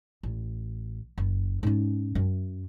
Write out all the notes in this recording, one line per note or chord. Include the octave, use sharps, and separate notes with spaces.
A1
F#1
G#2 C#4
F#2